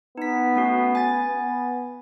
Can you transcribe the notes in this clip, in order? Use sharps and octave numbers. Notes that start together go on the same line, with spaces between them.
B3 D#4 B6
A3 C#4 F#4
G#5 A6
B3